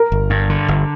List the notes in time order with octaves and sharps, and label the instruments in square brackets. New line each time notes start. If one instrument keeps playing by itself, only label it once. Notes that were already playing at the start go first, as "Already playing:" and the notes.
Already playing: [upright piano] A#4
[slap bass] G1
G2
D3
G1